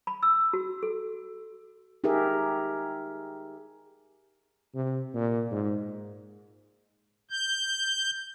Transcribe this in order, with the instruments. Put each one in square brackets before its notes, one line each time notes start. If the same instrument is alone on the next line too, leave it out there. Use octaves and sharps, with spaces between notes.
[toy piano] B5
E6
F#4
A4
[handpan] D#4 G4 G#4 A#4 E5
[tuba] C3
A#2
G#2
[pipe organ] G6